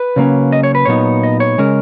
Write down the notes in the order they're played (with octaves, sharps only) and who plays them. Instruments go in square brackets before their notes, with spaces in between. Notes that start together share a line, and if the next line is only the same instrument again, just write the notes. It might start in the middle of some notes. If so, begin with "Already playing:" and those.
Already playing: [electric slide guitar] B4
C#3 F#3 A#3 C#4
D#5
C#5
B4
A#2 F#3 B3 D#4 C#5
D#5
C#5
C#3 G#3 C#4 A#4